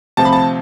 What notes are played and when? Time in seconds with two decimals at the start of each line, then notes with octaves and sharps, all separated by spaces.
0.17 D2 C3 F3 A5
0.25 B5
0.33 A5